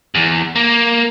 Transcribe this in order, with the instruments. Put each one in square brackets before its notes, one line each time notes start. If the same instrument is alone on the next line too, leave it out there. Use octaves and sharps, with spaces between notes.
[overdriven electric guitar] E2
A#3